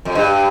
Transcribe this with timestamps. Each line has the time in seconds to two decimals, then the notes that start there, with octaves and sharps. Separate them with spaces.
0.05 F2
0.15 G2